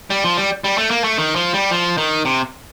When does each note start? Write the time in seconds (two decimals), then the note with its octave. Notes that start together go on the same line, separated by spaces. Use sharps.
0.10 G3
0.24 F3
0.37 G3
0.64 G3
0.78 A3
0.91 A#3
1.04 A3
1.18 D#3
1.35 F3
1.54 G3
1.71 F3
1.98 D#3
2.25 C3